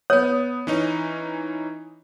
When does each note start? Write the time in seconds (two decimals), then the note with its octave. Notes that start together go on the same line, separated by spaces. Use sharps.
0.10 B3 C#5 D#6
0.67 E3 C#4 D#4